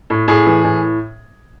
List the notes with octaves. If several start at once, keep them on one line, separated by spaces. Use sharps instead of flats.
A2
A2 G#4
E3
A2